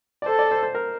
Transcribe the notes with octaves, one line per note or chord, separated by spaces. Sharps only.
D5
A4 C5
D5
C5
C5
A#4